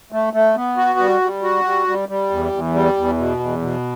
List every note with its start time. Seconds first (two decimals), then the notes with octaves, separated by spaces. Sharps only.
0.12 A3
0.33 A3
0.56 B3
0.77 F#4
0.99 G3
1.21 G3
1.43 F#4
1.64 G3
1.87 G3
2.09 G3
2.30 E2
2.52 E2
2.74 G3
2.96 E2
3.18 B2
3.40 E2
3.61 B2